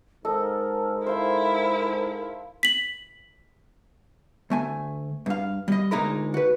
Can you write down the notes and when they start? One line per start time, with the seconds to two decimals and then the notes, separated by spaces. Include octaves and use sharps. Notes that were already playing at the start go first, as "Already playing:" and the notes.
0.25 G#2 A4 A#4 D#5
1.07 E4 A#4 C5 F5 C6
2.63 B6 F#7
4.50 D2 A3 G#5
5.26 G2 F5
5.68 G3 D#5
5.91 D2 A#2 G#3 D#4 A#4 B5
6.34 F#4 B4